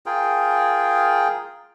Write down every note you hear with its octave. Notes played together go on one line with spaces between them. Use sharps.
F4 G#4 A#4 G5